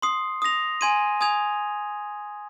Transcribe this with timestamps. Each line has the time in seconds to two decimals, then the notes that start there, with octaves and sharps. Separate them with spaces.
0.02 C6 D#6 C7
0.42 D#6 A#6 F7
0.81 G#5 C6 G#6 D#7
1.21 G#5 D#6 G#6 F7